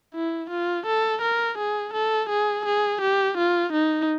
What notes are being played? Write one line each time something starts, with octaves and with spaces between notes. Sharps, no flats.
E4
F4
A4
A#4
G#4
A4
G#4
G#4
G4
F4
D#4